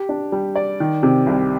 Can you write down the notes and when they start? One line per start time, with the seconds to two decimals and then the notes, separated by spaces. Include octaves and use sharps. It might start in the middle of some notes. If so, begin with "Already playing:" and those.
Already playing: G4
0.09 D4
0.32 G3
0.56 D5
0.80 D#3
1.03 C3
1.27 C2